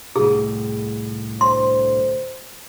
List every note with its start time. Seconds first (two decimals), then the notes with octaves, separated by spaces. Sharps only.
0.16 C2 A2 G#4
1.41 D2 D3 C5 C6